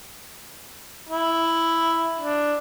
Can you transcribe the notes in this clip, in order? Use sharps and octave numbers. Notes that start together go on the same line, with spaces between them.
E4
D4